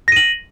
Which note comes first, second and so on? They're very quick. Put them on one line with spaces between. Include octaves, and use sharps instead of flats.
A#6 D#7 F#7